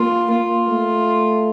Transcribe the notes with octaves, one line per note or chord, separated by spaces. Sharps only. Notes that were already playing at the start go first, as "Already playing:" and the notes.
Already playing: A#3 F4
A#3 F4
A3